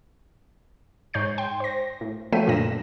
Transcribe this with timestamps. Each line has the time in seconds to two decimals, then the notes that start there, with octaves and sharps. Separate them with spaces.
1.14 G#2 C#5 G6 C7
1.38 G5 C6
1.60 C5 A#6
2.01 A2
2.32 F3 F#3 A3 G5 B6 D#7
2.47 A#1 F#2 A#2 D3 A#6 E7